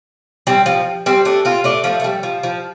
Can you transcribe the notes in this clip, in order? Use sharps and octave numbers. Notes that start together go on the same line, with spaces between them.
G3 C4
F3
G3 C4
A3 D4
C4 F4
A3 D4
F3 A3
A3
G3
F3
F3